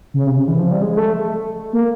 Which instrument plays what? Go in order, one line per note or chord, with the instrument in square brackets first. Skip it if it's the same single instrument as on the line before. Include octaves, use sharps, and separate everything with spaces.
[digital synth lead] C#3
C3
C#3
E3
F3
G3
G#3
A3
A#3